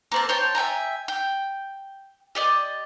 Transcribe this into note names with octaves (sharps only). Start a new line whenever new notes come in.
A#3 C4 A5
C5 C#5 G5 A5
E5 G5 G#5 A#5
G5
G4 D5 D#5